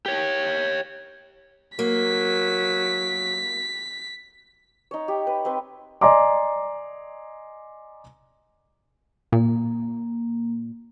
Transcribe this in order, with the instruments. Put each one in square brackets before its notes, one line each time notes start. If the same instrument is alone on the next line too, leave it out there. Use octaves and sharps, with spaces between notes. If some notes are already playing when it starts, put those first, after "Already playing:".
[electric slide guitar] G4 C#5
[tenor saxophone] F#3 [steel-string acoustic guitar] A#3 [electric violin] B6
[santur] D#4 C#5
G4
B4
C4 B4
[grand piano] D5 D#5 G#5 A#5 C6 D6
[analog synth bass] A#2 [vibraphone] A#3